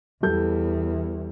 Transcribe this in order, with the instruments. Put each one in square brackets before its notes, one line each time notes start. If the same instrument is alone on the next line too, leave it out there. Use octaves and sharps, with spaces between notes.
[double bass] E2 [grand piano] G3 A4 G6